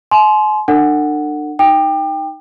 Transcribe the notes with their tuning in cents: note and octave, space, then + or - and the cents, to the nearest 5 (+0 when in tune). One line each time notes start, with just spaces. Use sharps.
G#5 +45 C6 -5
D4 +35 A4 +45 F#5 +0
D#4 +0 G5 +15 D6 +40